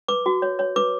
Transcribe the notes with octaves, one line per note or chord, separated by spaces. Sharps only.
B4 D6
F#4
C#5
C#5
B4 D6